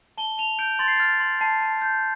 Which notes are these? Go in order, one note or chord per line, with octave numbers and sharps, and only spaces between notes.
A5 G7
A5 F7
G6 D7
C6 A6
C7
F6 A6
C6
A5 C7
A5
G6